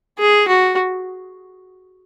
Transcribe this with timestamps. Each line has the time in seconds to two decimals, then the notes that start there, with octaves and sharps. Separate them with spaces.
0.18 G#4
0.47 F#4